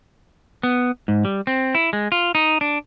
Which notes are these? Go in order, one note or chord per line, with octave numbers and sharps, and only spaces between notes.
B3
G#2
G3
C4
E4
G#3
F4
D#4
D4